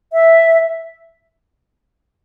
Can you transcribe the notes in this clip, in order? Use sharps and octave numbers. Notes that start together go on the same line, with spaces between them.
E5